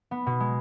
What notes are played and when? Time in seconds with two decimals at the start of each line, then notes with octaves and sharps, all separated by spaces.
0.11 B3
0.26 B2
0.40 G#3